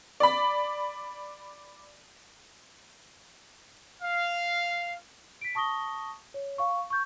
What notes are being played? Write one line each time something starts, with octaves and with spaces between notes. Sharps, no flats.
D5 B5
F5
B6 D7
A5 C#6 D#6 A#6 G7
C#5
F5 C#6
C#6 G6